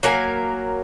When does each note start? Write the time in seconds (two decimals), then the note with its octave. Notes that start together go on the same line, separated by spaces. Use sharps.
0.03 F#3 A#3 A#4 G#5